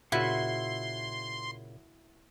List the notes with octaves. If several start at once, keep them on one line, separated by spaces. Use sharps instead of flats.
A#2 C#3 E4 F#4 E5 F#5 C6